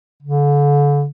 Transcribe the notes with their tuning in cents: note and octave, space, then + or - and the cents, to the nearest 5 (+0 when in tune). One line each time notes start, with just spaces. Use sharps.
D3 -35